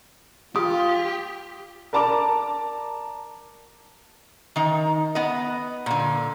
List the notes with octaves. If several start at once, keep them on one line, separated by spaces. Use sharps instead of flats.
F4 G4 D#6
A#4 D5 A5 A#5 D6
D#3 D#4
B3 D#5
A#2 D3